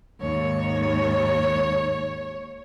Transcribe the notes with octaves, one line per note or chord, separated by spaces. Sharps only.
D#2 G#2 C#5